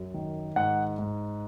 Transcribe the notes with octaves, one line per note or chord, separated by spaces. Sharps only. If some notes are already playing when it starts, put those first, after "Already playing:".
Already playing: F#2
D#3
G#2 F#5
G#2